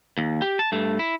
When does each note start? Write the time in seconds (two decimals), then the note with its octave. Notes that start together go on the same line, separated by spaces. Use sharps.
0.18 D#2
0.42 G4
0.59 A5
0.72 G2 A3
0.99 E4